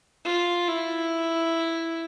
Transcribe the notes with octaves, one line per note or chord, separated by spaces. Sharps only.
F4
E4